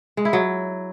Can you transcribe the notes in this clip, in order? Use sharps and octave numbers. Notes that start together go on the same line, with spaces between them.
G#3
E4
F#3